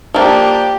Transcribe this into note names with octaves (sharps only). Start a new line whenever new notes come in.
F3 A#3 D4 G4